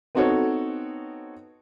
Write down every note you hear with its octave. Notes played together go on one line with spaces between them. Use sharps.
B3 C4 D#4 F#4 A4 C#5